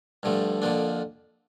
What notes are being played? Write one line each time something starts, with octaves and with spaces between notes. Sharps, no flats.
G2 D3 F3 A3
F2 D3 F3 A#3 D4